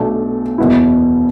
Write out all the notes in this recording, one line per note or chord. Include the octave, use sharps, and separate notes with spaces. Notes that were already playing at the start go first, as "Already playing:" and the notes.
Already playing: B1 B2 A3 D4
F#1 E2 B2 B3 E4